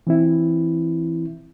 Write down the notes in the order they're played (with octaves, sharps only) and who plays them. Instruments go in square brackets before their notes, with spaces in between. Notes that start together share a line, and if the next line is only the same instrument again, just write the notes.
[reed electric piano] E3 C4 E4